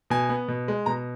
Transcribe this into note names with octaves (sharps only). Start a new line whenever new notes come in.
B2 G#5
B3
B2
G#3
B2 A#5